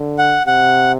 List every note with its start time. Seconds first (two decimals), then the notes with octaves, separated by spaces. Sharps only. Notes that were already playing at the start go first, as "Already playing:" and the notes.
Already playing: D3
0.18 F#5
0.47 C3 F#5